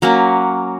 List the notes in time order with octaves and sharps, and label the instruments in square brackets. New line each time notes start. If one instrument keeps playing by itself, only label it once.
[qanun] F#3 A#3 C#4